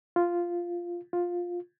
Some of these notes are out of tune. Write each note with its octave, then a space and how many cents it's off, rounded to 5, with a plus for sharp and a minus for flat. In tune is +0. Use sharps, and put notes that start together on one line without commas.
F4 -5
F4 +10